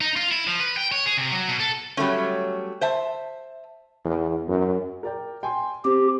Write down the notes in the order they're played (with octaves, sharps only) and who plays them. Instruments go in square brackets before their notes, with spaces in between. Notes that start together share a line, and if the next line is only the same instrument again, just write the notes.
[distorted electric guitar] D#4
F4
E4
F3
B4
G5
C#5
G#4
C3
F#3
B2
A4
[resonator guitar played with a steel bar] F#3 G3 A3 C#4
C5 E5 A5
[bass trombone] E2
F#2
[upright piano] A#4 D5 G5
G5 G#5 C6
[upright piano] C4 [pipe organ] G4